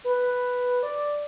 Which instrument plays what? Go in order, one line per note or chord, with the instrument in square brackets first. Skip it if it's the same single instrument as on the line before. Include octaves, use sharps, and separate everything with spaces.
[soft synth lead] B4
B4
D5